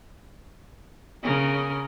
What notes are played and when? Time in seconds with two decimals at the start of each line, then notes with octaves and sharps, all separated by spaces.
1.23 C#3 A#4